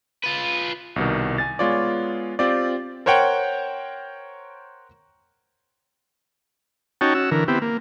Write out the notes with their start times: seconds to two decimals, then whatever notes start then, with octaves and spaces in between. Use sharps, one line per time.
0.24 F4 B4
0.96 C2 B2 D#3
1.38 G#5 A6
1.59 G#3 B3 F4 C#5 D5
2.39 C4 F4 G4 D5
3.06 A#4 C5 C#5 F#5 G5
7.01 C#4 D#4 F#4 C#5 G5 A5
7.15 C#4 F#4 E6
7.31 D3 E3 A#4
7.48 B3 C4 E4 G4
7.62 A#3